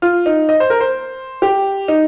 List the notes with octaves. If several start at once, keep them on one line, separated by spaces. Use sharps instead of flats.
F4
D#4
D#5
C5
A#4
C5
G4
D#4